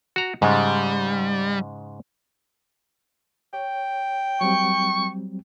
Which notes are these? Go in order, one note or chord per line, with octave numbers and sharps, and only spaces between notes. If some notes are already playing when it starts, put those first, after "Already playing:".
F#4 A#5
G#2 C#3 G3 G#3
C#5 G5
F#3 G3 C4 C#6